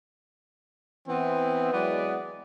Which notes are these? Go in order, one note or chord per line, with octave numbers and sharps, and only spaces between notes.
E3 B3 C4
E3 F#3 G#3 B3 B4 D5